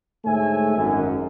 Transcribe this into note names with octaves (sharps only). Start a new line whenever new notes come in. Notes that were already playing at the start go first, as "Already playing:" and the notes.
D2 G#2 A3 C#5 E5 G#5
G#1 F#2